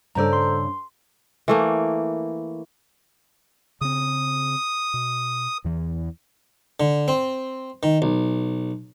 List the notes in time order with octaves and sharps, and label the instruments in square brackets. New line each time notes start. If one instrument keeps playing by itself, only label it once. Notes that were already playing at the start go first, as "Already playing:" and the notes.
[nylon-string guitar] G2 C#3 D5 [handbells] A4 C5 A#5
[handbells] C6
[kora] E3 A3 A#3
[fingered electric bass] C#3 C4 [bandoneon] D#6
[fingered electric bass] B2
E2 E3
[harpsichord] D3
C4
D#3
B1